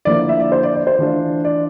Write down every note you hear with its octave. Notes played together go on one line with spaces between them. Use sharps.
D3 F3 A#3 E4 D5
E5
D5
C5
D5
D5
C5
E3 A3 D4 F4
D5